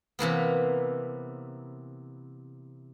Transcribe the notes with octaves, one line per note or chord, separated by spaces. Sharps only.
C3 E3 A#3 B3